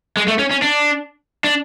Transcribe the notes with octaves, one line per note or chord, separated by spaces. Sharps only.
G#3
A3
C#4
C#4
D4
D4